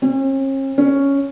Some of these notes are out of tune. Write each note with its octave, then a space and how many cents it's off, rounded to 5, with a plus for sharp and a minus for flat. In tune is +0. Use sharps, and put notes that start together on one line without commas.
C#4 -45
C#4 +0